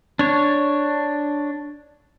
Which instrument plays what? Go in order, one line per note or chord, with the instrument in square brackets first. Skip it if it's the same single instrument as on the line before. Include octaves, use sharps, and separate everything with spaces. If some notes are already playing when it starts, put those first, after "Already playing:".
[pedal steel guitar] D4 C#5